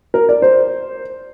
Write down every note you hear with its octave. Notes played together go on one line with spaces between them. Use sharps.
A#4
D5
C5